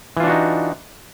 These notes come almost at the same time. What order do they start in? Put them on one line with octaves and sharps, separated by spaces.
E3 F4 D4 F#4 D#4